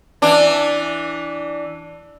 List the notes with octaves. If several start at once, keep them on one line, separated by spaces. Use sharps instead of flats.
E3 D4